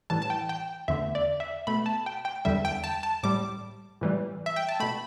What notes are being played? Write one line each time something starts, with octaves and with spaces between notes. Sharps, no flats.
A2 E3 G3 A5
A5
G5
G5
E2 D3 A3 E5
D5
E5
B2 A3 B5
A5
G5
G5
E2 D3 G3 E5
G5
A5
A5
A2 G3 D6
A2 E3 G3
E5
G5
A5
B2 A3 B5